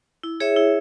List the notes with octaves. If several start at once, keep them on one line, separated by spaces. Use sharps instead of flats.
E4
G#4 C#5 E5
E4